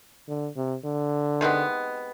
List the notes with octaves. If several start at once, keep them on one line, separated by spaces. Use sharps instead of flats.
D3
C3
D3
C3 D#3 G#3 B3